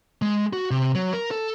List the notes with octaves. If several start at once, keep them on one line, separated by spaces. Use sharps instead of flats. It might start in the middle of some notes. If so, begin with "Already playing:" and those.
G#3
F#4
C3
F#3
A#4
A4